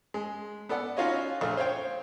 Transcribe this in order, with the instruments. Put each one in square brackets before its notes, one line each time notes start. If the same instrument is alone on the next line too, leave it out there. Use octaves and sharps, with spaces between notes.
[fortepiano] G#3
B3 A4 D5 F#5
C#4 D#4 F4 F#4 C#5 D#5
A#1 A3 F6
C5 C#5 F5 G5